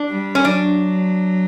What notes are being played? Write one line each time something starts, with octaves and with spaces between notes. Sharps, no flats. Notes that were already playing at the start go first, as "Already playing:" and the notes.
Already playing: D4
G3
C#4
F#3 D4